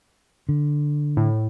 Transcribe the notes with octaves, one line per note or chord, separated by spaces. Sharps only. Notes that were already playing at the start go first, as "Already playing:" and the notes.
D3
A2